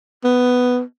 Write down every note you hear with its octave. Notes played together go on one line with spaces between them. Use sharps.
B3